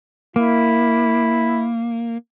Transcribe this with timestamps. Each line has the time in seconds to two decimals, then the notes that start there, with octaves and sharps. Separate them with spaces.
0.36 A#3 E4